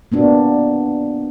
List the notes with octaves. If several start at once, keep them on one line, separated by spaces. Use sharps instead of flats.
A#3 B3 D4 F#4